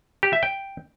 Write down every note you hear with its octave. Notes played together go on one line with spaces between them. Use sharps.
G4
E5
G5